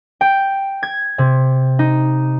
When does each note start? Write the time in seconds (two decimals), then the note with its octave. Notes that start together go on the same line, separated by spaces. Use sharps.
0.21 G5
0.83 G#6
1.18 C3
1.79 D#4